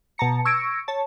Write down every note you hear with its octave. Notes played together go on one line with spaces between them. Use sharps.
B2 A5 A#5 C#7
C#6 E6 G#6 A#6 C#7 D7
C#5 A5